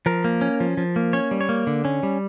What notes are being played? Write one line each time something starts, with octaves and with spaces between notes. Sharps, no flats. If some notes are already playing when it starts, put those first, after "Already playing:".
F3 A#4
A#3
C#4
F3
F3
A#3
C#4 C#5
G3
C#5
A#3
D3
C#4
G3